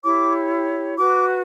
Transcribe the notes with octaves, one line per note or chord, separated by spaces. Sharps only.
E4 G4 C#5 D6
F#4 B4 D6